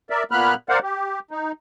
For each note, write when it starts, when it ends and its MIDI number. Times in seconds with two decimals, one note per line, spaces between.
0.10 0.23 70
0.10 0.23 74
0.10 0.23 76
0.31 0.54 46
0.31 0.54 58
0.31 0.54 59
0.31 0.54 83
0.31 0.54 89
0.31 0.54 90
0.69 0.79 70
0.69 0.79 72
0.69 0.79 74
0.69 0.79 77
0.69 0.79 78
0.83 1.19 67
1.31 1.52 63